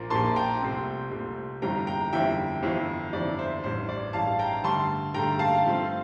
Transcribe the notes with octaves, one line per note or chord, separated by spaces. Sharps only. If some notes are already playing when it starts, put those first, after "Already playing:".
Already playing: A#1 A#2 F3 A#3
A#1 A#2 F3 A#3 A5 C6
G5 A#5
C2 A#2 A3 C4
C2 A#2 A3 C4
G1 F2 E3 G3 G5 A#5
G5 A#5
G1 F2 E3 G3 E5 G5
G1 F2 E3
G1 F2 E3 D5
C5 E5
A1 G2 E3 C5
D5
A1 G2 E3 F5 A5
G5 A#5
G2 D3 A3 A5 C6
G2 D3 A3 G5 A#5
F5 A5
G2 F3 A3 C4